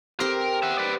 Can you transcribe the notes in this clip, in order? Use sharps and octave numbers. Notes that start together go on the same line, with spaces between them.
C4 G4 A#4 C6
E5 F#5
B4 D5